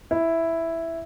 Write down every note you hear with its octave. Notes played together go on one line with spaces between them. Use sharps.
E4